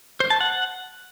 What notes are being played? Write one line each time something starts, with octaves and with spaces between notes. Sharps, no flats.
C5
A5
F#5